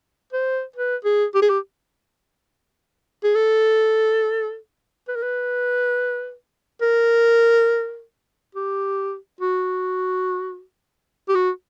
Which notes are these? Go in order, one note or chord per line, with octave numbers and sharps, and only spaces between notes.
C5
B4
G#4
G4
G#4
G4
G#4
A4
B4
A#4
B4
A#4
G4
F#4
G4
F#4